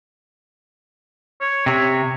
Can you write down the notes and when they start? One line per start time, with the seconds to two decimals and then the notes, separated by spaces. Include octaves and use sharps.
1.41 C#5
1.66 C3 C#5